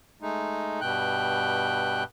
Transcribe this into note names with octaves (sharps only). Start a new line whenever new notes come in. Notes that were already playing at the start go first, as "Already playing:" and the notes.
G#3 A3 D#4
G2 B2 G5 F#6